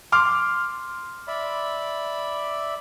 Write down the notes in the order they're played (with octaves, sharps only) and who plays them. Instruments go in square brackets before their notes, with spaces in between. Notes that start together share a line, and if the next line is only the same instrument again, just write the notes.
[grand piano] C6 D6 F6
[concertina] D5 E5 B5